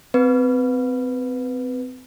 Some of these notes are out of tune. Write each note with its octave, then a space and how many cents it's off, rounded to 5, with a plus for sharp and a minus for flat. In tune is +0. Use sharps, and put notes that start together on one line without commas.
C4 -30 B4 +0